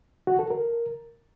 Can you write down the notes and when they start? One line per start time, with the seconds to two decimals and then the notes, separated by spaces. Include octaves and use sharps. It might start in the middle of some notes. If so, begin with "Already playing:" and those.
0.27 F#4
0.39 A4
0.50 A#4